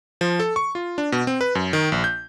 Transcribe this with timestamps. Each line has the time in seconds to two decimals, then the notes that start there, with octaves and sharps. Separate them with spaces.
0.21 F3
0.40 A4
0.56 C#6
0.75 F4
0.98 D4
1.12 B2
1.27 C4
1.41 B4
1.55 F#2
1.73 D#3
1.92 A#1
2.04 G6